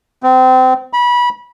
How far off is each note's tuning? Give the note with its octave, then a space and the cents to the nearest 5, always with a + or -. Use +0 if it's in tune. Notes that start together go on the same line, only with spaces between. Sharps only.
C4 -30
B5 -25